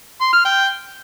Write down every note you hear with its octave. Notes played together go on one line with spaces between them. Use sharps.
C6
F6
G5